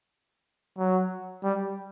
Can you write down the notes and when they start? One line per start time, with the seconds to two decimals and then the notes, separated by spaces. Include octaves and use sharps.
0.78 F#3
1.44 G3